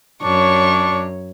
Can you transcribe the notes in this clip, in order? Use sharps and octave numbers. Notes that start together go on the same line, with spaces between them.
F#2 D4 C#5 C#6